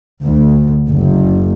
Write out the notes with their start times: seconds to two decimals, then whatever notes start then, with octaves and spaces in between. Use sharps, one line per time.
0.25 D2
0.87 F#1